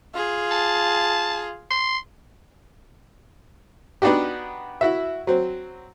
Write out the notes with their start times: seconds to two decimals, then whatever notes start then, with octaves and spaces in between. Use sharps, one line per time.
0.14 F4 G#4
0.51 A5
1.71 C6
4.02 B3 D4 D#4 F#4 G4
4.81 E4 F#4 E5
5.27 F#3 C4